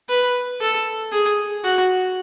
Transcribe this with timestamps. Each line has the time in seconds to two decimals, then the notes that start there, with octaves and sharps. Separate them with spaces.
0.09 B4
0.61 A4
1.12 G#4
1.64 F#4